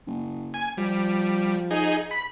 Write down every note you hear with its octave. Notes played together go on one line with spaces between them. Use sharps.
F#1
G#5
F3 G3
D#4 G#4
B5